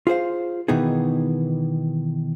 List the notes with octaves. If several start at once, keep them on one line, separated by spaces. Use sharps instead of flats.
F4 G#4 C5 F5
B2 D#3 E3 B3 D#4 G#4